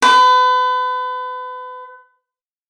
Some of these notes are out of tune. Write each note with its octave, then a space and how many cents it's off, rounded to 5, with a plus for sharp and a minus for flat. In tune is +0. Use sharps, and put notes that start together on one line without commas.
B4 +35